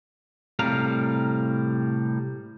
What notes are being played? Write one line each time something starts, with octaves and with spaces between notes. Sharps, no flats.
A2 C3 G3 A#4 F5